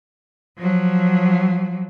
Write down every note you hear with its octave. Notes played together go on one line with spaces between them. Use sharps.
F3 F#3